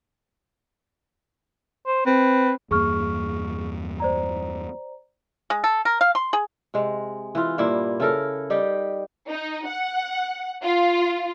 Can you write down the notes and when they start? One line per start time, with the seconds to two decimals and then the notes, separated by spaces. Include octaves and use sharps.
1.87 C5
2.06 C4 B4
2.71 E2 G2 A#3 G#4 C#6 F6
4.00 C5 D5 A#5
5.50 G#3
5.64 A4
5.85 A#4
6.01 F5
6.15 C6
6.33 G#4
6.74 C3 G#3
7.35 E3 F4
7.58 G2 A#2 A#3 E4
8.00 C#3 E4 A4 A#4
8.50 G3 D#4 G4
9.30 D#4
9.67 F#5
10.62 F4